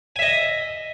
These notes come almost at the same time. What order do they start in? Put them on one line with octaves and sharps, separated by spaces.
G#5 E5 D#5